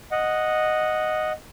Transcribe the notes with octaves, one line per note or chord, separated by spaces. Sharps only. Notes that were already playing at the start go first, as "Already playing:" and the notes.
D#5 F#5